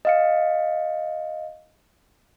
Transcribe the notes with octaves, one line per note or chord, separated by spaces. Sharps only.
D#5 F5 C#7